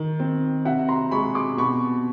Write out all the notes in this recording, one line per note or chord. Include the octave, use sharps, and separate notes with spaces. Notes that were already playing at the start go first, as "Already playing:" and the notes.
Already playing: D#3
C4
C3 E5 F#5
A#5 C6
G#3 B5 C#6
C6 D6
B2 B5 C#6